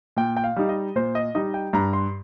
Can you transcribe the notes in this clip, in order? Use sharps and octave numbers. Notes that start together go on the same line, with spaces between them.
A#2 G5
G5
F5
G3 D#4
D#5
A#2 C5
D#5
G3 D#4 D#5
G5
G2 A#5
C6